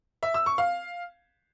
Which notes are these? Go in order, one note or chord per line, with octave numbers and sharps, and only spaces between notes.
E5
E6
C#6
F5